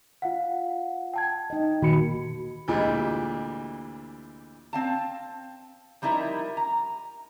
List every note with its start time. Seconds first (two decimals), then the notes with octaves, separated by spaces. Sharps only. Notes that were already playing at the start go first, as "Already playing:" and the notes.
0.22 F4 F5 F#5
1.14 G5 A5 G#6
1.50 D#4 D#5
1.82 A#2 D#3 A#3 F#4 B5 C#7
2.68 D2 A#2 E3 G3 G#3
4.73 C4 F5 A5
6.02 F3 G3 D#4 E4 A#4
6.57 A#5